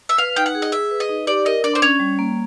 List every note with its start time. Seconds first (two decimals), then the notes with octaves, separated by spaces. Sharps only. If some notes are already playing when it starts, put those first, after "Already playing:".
0.09 E5
0.18 B4 F5
0.36 D#4 G5
0.46 F#5
0.55 G#4
0.62 D#5
0.72 G#4 E5
0.91 B4
1.00 D#5
1.09 D#4
1.27 G4 D5
1.45 A#4 D#5
1.64 D4 D5
1.75 C5
1.82 C#4 C#5
2.00 G3
2.19 A#3